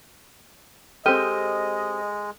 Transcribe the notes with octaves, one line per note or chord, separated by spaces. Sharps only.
G#3 C4 G4 A4 D#5 F6 D#7